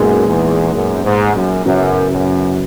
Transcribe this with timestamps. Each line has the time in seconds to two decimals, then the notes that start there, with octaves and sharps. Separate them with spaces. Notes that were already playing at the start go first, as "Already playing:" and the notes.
Already playing: F#2 A#2 G#3 B3 D#4 G#4
0.26 E2
0.73 F#2
1.04 G#2
1.35 F#2
1.65 F#2 C#3 F#3 B3 E4
2.11 F#2